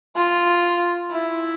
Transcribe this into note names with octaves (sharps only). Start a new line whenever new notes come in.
F4
E4